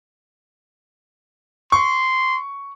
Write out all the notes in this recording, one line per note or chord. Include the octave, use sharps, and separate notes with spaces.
C6 C#6